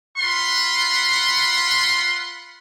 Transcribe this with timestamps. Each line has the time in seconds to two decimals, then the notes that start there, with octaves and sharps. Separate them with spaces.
0.17 F4 F#5 B5 C6